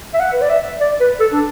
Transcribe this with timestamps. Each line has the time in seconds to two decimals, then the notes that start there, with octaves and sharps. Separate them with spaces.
0.14 E5
0.20 F#5
0.33 B4
0.41 D5
0.50 E5
0.80 D5
1.00 B4
1.20 A4
1.33 D4